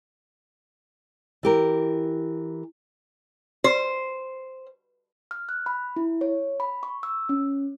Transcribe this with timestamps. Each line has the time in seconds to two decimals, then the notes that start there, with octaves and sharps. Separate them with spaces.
1.43 E3 G4 A#4
3.64 C5
5.31 F6
5.49 F#6
5.66 B5
5.96 E4
6.21 C#5
6.60 B5
6.83 C#6
7.03 E6
7.29 C#4